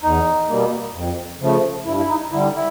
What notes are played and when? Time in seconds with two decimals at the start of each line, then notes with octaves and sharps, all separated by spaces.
0.03 E2 D#4
0.49 B2 G3 A#3
0.94 F2
1.40 C#3 F3 A3
1.86 G2 E4
1.98 E4
2.09 D#4
2.32 D3 G3 E4
2.55 E4